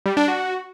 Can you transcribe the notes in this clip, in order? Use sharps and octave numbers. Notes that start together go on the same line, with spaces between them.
G3
D4
F#4